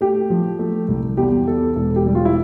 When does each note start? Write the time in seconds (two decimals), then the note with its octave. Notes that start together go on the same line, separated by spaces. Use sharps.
0.01 A3 G4
0.30 F3
0.59 A3
0.88 C2
1.17 E2 G4
1.47 E2 A4
1.76 E1 A4
1.96 G4
2.06 G3
2.15 F4
2.25 E4